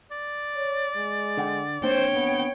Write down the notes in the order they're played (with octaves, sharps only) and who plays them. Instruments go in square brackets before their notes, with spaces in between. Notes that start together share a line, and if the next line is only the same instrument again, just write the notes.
[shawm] D5
[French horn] C#5
G#3
[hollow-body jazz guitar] D3 F#5 G5
[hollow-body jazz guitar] A#3 C4 D4 [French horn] C5 [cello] C#5 G5
[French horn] B3